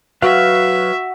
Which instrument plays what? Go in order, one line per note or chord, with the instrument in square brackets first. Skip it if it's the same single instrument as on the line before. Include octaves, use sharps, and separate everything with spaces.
[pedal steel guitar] F#3 B4 F5 [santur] F#4 [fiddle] E5